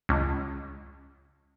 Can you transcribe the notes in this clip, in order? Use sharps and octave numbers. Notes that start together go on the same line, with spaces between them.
C#2